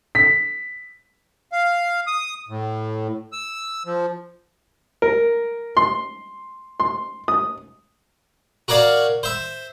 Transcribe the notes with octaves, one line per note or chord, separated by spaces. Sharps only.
B6
F5
D#6
A2
E6
F3
A#4
C6
C6
D#6
F#4 A#4 C#5 D5 F5
C5 E5